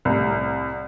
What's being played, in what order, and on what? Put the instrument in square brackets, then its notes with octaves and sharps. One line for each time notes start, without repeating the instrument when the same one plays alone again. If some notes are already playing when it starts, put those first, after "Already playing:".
[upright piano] C2 A2